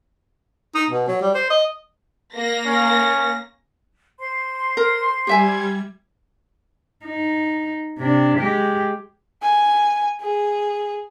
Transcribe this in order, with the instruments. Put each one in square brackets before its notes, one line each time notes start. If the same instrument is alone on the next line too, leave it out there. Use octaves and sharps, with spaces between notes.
[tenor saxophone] D#4
B2
F#3
G3
C5
D#5
[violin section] A#3 A#6
[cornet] C#4
[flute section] C5 C6
[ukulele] A#4
[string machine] G3 G#6 [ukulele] G4 E5 G#5
[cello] D#4
C3 D4
G#3 G4
[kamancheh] G#5
G#4